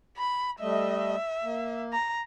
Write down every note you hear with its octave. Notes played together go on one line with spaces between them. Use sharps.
B5
G3 A3 D#5 E5
A#3
A#5